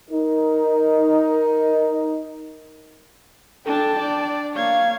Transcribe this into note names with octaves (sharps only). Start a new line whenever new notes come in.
D#4 A#4
D4 A4 G5 A5
D4 D5
A#3 C#5 F5 G#6